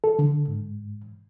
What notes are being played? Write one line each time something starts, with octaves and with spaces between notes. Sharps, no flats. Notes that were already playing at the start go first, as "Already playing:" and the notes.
A4
D3
G#2